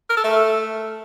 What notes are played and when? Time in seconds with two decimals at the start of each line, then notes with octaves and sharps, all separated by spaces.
0.09 A#4
0.17 A4
0.24 A3